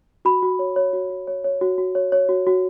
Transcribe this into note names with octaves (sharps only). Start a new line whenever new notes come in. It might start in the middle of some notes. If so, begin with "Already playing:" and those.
F#4 B5
F#4
C#5
C#5
F#4
F#4
C#5
C#5
F#4
F#4
C#5
C#5
F#4
F#4